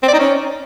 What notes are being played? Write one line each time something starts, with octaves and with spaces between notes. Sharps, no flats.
C4
D5
D#4
C#4